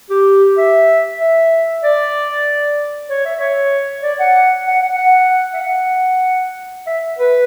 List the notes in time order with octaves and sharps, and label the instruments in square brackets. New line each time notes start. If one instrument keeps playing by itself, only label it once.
[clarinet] G4
E5
E5
D5
C#5
E5
C#5
D5
F#5
F#5
F#5
F#5
E5
F#5
E5
B4